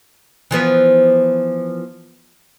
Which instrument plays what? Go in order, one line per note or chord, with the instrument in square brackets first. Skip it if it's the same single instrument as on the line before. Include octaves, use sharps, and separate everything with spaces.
[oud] E3 F3 B3